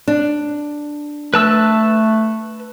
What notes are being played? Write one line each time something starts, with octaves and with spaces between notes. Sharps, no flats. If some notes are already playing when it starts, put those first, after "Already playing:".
D4
A3 B4 A5 E6